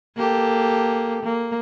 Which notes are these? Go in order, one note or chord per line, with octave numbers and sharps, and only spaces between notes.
A#3 G4 A4
A#3